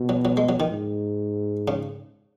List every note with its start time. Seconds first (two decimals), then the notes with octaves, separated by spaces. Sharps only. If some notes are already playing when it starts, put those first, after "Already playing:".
Already playing: B2
0.09 F#3
0.25 F#3
0.37 G#3
0.49 F#3
0.60 D#3
0.72 G#2
1.68 C#3